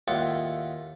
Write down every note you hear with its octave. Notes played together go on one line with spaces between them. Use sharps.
D#2 A2 F4 F#5 G5